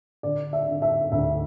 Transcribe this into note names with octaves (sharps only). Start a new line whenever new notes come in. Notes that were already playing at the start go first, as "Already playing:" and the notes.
D3 D5
E5
D3
E5
D2 E5